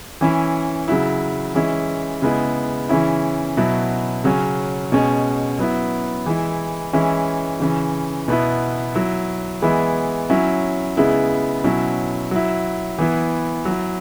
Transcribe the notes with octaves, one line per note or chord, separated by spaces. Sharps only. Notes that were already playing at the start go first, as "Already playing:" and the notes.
E3 C#4 E4
C#3 F#3 E4
E3 G#3 C#4 E4
C#3 G#3 B3 E4
C#3 E3 C#4 E4
B2 F#3 E4
C#3 F#3 C#4
B2 G#3 C#4
F#3 B3 E4
E3 G#3 E4
E3 G#3 C#4 E4
C#3 E3 C#4
B2 B3 E4
F#3 E4
E3 G#3 B3 E4
F#3 C#4 E4
C#3 G#3 B3 E4
B2 F#3 C#4 E4
F#3 E4
E3 B3 E4
F#3
E4